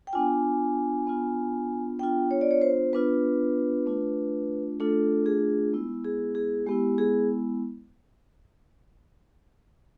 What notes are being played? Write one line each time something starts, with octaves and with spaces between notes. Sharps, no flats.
G5
B3 D4 F4 G#5
B3 D4 F4
B3 D4 F4 G5
C#5
D5
C#5
C5
B3 D4 F4 B4
A3 D4 F4
A3 D4 F4 A4
G#4
G#3 B3 E4
G#4
G#4
G#3 B3 E4 G4
G#4